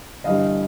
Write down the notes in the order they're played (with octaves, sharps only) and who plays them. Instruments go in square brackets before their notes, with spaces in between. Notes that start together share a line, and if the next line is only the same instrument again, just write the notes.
[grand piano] G1 G2 E3 G3 D#5 F5